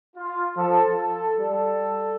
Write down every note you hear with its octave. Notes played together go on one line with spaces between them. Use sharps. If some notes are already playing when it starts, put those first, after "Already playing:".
F4
F3 A4
A4
G3 A4